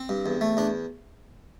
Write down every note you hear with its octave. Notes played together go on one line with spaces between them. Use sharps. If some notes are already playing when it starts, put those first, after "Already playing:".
Already playing: C4
G2
E2
A3
E2 D4